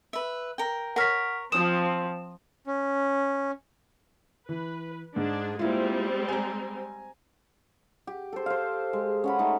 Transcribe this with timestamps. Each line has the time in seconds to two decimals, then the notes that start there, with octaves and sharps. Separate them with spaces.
0.13 B4 E5
0.58 A#4 G5
0.96 A#4 C#5 F#5 F6 B6
1.52 F3 C4 D#6 E7
2.67 C#4
4.49 E3 B4
5.16 G#2 D4 G#4
5.59 G3 G#3 A#3 C4 E4 F4
6.29 G#5 A#5
8.07 G4
8.33 A4 C5
8.46 C5 F5
8.93 G#3
9.24 C#4 F#5 B5
9.39 A3 D#4